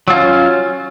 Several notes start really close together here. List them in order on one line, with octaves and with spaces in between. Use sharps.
F#3 F4 C#4